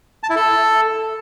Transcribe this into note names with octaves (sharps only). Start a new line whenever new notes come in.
A5
E4
A4